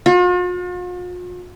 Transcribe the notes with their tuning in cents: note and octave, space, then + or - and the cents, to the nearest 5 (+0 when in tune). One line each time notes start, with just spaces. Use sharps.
F4 +45